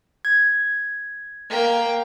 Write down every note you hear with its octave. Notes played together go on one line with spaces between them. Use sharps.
G#6
A#3 G5